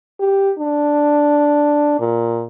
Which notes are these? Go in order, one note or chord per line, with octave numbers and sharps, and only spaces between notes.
G4
D4
A#2